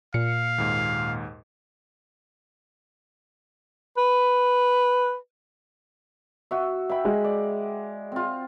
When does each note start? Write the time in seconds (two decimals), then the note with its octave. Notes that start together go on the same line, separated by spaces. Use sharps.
0.14 A#2 F5 C#7
0.58 D#2 G#2
3.98 B4
6.51 F#4 E5
6.89 E5 G5 B5
7.05 G#3
7.24 D5
8.12 C4 F4